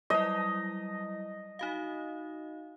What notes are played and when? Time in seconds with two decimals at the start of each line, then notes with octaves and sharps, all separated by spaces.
0.10 F#3 G3 E4 D#5
1.59 D#4 F#4 F5